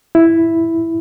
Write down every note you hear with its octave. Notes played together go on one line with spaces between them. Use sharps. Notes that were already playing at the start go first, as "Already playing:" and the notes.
E4